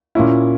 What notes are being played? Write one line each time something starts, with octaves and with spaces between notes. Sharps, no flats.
A#2 A#3 C#4 E4